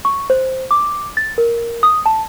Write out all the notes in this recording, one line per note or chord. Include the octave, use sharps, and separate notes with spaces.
C#6
C5
D6
A6
A#4
D#6
A5